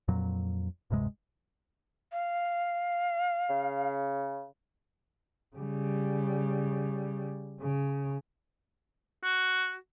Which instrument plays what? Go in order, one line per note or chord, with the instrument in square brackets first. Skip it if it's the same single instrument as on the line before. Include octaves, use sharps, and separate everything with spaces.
[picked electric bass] F2 A#2 F#3
D1 G2 C3 G#3
[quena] F5
[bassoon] C#3
[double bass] C#3 G3
C#3
[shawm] F#4